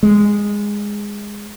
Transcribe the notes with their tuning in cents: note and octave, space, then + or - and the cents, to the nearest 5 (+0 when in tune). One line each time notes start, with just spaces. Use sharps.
G#3 -10